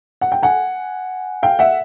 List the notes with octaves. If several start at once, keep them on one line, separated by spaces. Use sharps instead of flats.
F#5
G5
F#5 G#5
F5 G5
E5 F#5